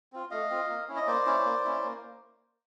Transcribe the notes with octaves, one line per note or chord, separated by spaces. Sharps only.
C4 F4
A3 D#5 F5
C4 F4
A#3
C#4 E4
D#5
A#3 C5 D5
C#4 E4
A#3
C#4 E4
A#3